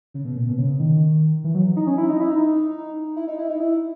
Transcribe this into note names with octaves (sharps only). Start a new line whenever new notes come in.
C#3
B2
A#2
B2
C#3
D#3
E3
F#3
D#4
C#4
E4
D#4
E4
D#4
E4
D#4
E4
D#4
E4